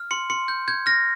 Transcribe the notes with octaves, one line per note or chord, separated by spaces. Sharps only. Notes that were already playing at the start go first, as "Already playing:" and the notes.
Already playing: F6
C6 C#7
C6 C#7
G6
G6 G#6
F6 A#6